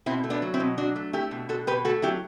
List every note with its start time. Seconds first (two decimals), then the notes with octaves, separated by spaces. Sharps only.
0.06 B2 C4 E4
0.24 A3
0.30 B3 D4
0.42 F#3
0.54 C4 E4
0.60 B2
0.78 F#3 D4 F#4
0.96 A3
1.13 A3 E4 G4
1.31 B2
1.49 B2 F#4 A4
1.67 B2 G4 B4
1.85 A3 F#4 A4
2.02 F#3 E4 G4